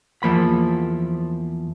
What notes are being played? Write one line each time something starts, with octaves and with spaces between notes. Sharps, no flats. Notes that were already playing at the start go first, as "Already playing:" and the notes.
E2 F3 A#3 B5